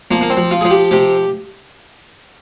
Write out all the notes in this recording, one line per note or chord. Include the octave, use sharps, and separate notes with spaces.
F3 A#3
A#3
C4
F3
F4
F3 G#4
G4
C3 G4